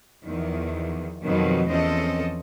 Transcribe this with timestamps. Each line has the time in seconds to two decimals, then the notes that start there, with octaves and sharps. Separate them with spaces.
0.23 E2 D#3 F3
1.24 F2 B2 D#3 F#3
1.69 E2 F3 C4 C#4 A4 D#5